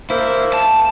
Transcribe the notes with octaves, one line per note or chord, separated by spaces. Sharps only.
A#3 E4 C5
A5